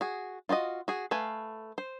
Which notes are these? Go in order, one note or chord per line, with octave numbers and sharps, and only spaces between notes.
F#4 G#4
F4 F#4 G#4 D#5
F#4 G#4
A3 B4 F5 G#5
C5